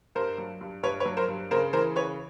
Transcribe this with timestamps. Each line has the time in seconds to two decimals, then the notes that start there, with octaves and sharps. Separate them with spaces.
0.15 G2 A#4 C5
0.38 F#3
0.61 G2
0.83 G2 B4 C#5
1.00 B4 C#5
1.05 F#3
1.17 A#4 C5
1.28 G2
1.51 C#3 A#4 C5
1.73 E3 A#4 C5
1.96 C#3 B4 C#5